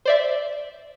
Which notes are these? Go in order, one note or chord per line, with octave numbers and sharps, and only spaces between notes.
C5 D5 E5